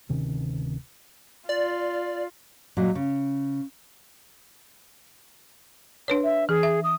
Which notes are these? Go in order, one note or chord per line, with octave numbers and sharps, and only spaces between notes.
D1 C3 D#3 C#4
F4 D5
A#2 F#3 G#3
C#3
D4 B4 C#5
E5
E3 G#4
E5
D#6